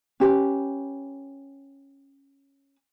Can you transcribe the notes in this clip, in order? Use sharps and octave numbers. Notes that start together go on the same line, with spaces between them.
C#4 G4 B4